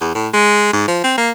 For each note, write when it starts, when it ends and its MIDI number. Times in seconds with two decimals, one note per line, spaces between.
0.01 0.12 40
0.15 0.28 45
0.33 0.71 56
0.73 0.87 44
0.88 0.99 53
1.04 1.16 60
1.18 1.31 58